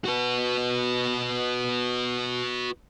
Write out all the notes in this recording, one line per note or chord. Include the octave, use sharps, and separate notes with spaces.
F#4 B4